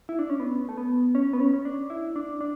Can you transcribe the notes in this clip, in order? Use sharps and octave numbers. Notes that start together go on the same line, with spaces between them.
E4
D4
C#4
B3
A3
B3
C#4
B3
C#4
C#4
D4
E4
D4
D4